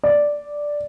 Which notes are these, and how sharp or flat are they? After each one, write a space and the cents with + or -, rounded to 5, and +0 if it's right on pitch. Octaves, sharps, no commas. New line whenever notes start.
D5 +0